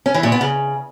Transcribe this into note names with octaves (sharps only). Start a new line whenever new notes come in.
C#4
E3
A#2
B3
C#3